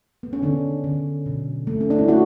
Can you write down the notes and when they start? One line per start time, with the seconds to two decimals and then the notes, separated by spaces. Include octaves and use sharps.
0.23 B3
0.33 C#4
0.42 D3 D4
0.84 D3
1.26 B2
1.67 A3
1.81 C#4
1.90 D4
1.98 E4
2.08 A3 F#4